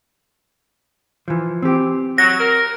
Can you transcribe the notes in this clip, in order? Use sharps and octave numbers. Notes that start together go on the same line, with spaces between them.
E3 F3
C4 G4
F#3 A#6
A#4